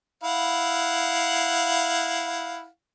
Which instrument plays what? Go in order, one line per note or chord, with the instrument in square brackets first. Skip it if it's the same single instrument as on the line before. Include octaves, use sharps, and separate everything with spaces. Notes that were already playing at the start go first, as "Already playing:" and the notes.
[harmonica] E4 F5 F#5